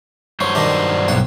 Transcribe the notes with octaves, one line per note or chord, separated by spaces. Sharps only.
G2 F#3 C5 C#5
D#3 G3 D4
B1 F#5 G5